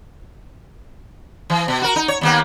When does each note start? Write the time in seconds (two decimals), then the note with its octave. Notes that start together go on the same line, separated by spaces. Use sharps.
1.50 E3
1.68 B2
1.82 F#4 A#4
1.96 D#4
2.08 C#5
2.21 D#2 A#3 B3